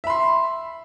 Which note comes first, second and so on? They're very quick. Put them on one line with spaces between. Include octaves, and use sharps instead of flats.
E5 B5 C6